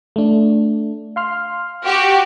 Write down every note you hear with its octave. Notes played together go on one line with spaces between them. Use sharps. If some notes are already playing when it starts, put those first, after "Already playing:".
A3 D4
F5 C6 F6
F#4 G4